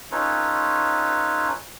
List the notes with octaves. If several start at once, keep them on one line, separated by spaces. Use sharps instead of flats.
C#4 D#4 F4 A4 B4 C#5